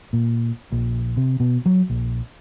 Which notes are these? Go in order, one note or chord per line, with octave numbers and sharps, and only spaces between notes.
A#2
A#1
C3
B2
F#3
A#1